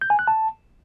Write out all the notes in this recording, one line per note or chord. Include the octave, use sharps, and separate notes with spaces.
G6
G#5
F#6
A5